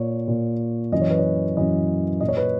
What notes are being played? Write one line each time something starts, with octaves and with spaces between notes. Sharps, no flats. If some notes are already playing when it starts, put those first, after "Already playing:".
Already playing: A#2 C#5
A#2
F#2 E3 D#5
C#5
B4
C#5
F#2 E3 D#5
A#2 D#5
C#5
B4